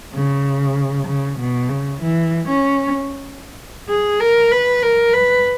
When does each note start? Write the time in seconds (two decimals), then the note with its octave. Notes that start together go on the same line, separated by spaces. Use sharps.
0.14 C#3
1.07 C#3
1.39 B2
1.70 C#3
2.02 E3
2.48 C#4
3.89 G#4
4.21 A#4
4.52 B4
4.83 A#4
5.14 B4